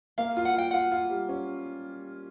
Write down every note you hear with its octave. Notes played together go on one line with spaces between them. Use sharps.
A#3 F5
F4
F#5
F4 G5
F4 F#5
F4
G3
C#4